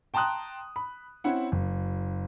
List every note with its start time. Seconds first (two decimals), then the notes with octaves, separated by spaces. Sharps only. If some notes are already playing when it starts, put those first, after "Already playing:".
0.14 G5 A5 A#5 C6 D#6 F#6
0.76 B5
1.24 C4 C#4 E4 F#5
1.52 F#1